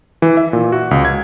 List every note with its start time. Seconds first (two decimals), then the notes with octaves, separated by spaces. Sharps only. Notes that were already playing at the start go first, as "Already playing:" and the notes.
0.22 E3
0.37 E5
0.53 A#2
0.72 F#4
0.91 C#2
1.05 G#6